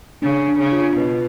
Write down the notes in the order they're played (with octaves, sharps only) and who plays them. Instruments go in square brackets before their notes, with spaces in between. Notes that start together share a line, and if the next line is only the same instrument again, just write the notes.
[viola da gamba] C#3 [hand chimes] D4
[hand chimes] D4
[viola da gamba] C#3
[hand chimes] F4
[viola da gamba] B2 [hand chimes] B4